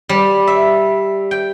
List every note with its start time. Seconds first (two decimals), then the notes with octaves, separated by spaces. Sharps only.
0.09 G3
0.47 E5
1.31 G5